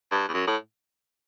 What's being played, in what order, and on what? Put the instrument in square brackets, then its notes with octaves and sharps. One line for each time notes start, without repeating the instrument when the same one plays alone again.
[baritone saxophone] G2
E2
F#2
A2